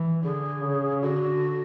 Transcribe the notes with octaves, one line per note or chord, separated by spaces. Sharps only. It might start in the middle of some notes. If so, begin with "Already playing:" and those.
Already playing: E3
D3 G#4
C#3
D3 F#4